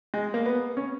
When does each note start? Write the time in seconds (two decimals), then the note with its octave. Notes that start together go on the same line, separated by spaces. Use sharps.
0.14 G#3
0.34 A#3
0.46 B3
0.77 C#4